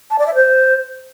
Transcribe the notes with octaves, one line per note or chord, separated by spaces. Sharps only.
A5
D5
E5
C5